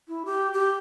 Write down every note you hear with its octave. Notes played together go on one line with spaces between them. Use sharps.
E4
G4
G4